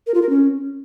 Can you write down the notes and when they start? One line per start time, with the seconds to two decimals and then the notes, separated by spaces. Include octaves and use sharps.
0.07 A#4
0.14 F4
0.22 A#4
0.30 C#4